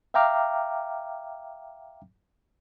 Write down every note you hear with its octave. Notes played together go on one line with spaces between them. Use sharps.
E5 F5 G5 A#5 D6 F6